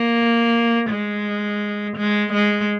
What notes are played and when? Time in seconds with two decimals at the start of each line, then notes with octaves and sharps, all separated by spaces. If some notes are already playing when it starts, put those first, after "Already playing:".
Already playing: A#3
0.90 G#3
1.97 G#3
2.33 G#3